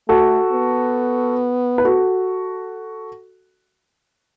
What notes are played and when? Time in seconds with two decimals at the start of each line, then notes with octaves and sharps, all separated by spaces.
0.08 A3 F#4 A4
0.52 B3
1.78 B4
1.84 F#4 A4